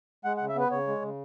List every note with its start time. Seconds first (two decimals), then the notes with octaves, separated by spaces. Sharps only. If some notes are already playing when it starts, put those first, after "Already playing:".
0.25 G#3 F#5
0.37 F#5
0.41 C#3
0.49 E5
0.56 B3 B4
0.71 C#3 C#5
0.87 G#3
1.02 C#3